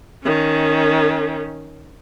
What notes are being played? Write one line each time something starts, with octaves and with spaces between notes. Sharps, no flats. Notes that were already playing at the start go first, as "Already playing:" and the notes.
D#3 C#4